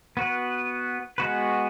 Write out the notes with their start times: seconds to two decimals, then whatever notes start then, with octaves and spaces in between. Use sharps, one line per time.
0.17 B3 F#4 B4
1.18 G#3 B3 F#4 B4